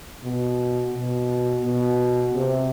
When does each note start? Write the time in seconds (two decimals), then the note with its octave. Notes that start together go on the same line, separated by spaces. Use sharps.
0.24 B2
0.94 B2
1.64 B2
2.34 C3